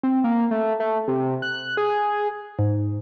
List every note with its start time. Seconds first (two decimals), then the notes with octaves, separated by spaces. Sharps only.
0.03 C4
0.24 A#3
0.51 A3
0.80 A3
1.08 C3
1.42 F#6
1.77 G#4
2.59 G#2